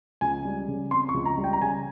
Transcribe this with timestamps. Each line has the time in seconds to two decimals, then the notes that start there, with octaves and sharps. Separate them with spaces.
0.21 C#2 G#5
0.45 G3
0.68 C#3
0.91 C4 C6
1.09 C#6
1.14 C#2
1.26 A#5
1.38 G3
1.44 G5
1.53 A#5
1.61 C#3 G#5